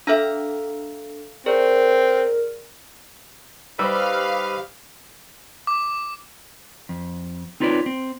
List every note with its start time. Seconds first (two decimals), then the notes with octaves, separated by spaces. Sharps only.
0.07 D4 A4 E5 F5 A#5
1.46 C4 G#4 A#4 D5
3.79 G3 D#4 G4 B4 C5 F5 D6 E6
5.67 D6
6.89 F2
7.60 C4 D#4 F4 B4 C#5 D5
7.86 C4